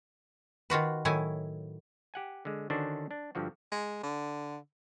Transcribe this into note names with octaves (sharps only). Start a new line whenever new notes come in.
D#3 F4 F#4 B4
A2 D#3 F#3 E4 G#5
G4 F#5 G#5
D3 G#3
D3 D#3 C#4 D4 F#4 C5
D4
G2 D3 F3 F#4
G#3
D3